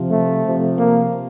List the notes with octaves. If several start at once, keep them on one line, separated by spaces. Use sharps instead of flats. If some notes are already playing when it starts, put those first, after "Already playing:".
Already playing: C3 F3
A3
C3 F3
A#3